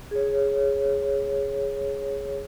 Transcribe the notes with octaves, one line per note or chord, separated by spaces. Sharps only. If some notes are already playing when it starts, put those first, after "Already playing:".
G#4 C#5